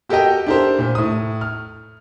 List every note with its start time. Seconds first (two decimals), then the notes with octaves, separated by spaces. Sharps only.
0.09 F#4 G4 A4 A#4 D#5 G5
0.47 D4 E4 G4 A4 A#4 C5
0.78 A#2 C5
0.95 A2 D#6
1.41 F6